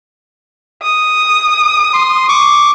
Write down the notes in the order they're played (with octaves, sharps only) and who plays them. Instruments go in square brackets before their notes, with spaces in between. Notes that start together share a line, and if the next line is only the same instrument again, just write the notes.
[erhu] D#6
[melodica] C6
C#6 D6